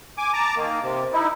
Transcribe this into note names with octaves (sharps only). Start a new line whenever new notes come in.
G#5 D6
A5 A#5 D6
D#3 A#3
C3
D#4 E4